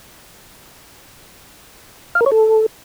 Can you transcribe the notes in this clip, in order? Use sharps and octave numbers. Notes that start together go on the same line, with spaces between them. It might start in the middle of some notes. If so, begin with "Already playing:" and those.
F5
A#4
C#5
A4